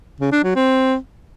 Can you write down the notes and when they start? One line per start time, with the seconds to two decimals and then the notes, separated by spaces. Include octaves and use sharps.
0.20 C#3
0.32 D4
0.44 F#3
0.56 C4